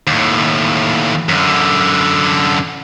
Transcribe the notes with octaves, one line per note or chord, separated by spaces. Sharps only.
D#2 A2
F#2 D3